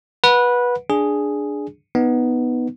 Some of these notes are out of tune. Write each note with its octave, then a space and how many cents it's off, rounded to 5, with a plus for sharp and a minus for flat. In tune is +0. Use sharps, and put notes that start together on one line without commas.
B4 -15 F#5 -20
D4 +0 G#4 +0
B3 +0 D#4 -5